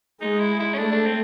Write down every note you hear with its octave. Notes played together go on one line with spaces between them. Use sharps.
G#3 D#4
E4
E4
C#4
A3 D4
D4
C4